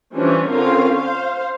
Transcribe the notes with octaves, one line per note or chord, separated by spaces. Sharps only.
E3 F3 G3 C#4 D4
D3 C4 C#4 F4 A#4 F5
C5 F5